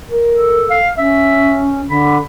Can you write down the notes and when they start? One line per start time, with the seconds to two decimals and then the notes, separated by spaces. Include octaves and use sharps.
0.10 A#4
0.32 A4
0.70 F5
0.97 C#4 E5
1.89 D3 B5